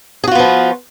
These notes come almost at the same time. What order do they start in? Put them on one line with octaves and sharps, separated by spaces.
G#4 F#4 F4 B3 F3